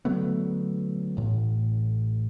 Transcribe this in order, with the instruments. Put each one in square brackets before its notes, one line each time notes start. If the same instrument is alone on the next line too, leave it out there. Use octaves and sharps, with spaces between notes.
[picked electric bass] D3 F#3 A3 B3
A1 A2